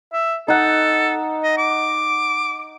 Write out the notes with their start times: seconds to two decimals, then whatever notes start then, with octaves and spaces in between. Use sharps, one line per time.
0.13 E5
0.48 D#4 A4 F#5
1.44 D#5
1.58 D6